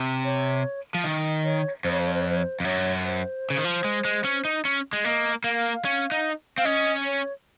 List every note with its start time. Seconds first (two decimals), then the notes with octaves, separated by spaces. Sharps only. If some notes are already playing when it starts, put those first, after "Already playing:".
Already playing: C3
0.24 C#5
0.94 F3 F5
1.04 D#3 D#5
1.44 C#5
1.84 F2 C5
1.92 C#5
2.00 C5
2.07 C#5
2.14 C5
2.21 C#5
2.30 C5
2.37 C#5
2.44 C5
2.60 F2
2.64 F#2 C#5
3.05 C5
3.50 C#3
3.57 D#3
3.64 F3
3.84 G#3
4.05 G#3
4.25 C#4
4.45 D#4
4.65 C#4
4.93 G#3
5.04 A#3 D#5
5.44 A#3 F5
5.85 C#4
6.12 D#4
6.58 C4 F5
6.65 C#4 D#5
7.05 C#5